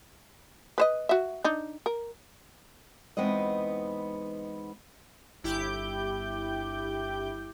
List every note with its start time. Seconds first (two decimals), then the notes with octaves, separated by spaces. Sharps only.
0.78 B4 C5 D#5
1.09 F#4 E5
1.44 D4 D#4
1.86 A#4
3.17 E2 G#3 B3 C4 D#4 D#5
5.43 G1 E4 G4 D6 G6